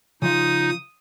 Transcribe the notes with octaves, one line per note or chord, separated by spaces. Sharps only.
C#3 F3 D#4 F4 F5 D#6